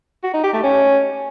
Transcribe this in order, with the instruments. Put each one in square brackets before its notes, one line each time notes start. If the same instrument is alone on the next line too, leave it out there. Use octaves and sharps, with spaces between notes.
[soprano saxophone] F#4
D#4
G4
A3
C#4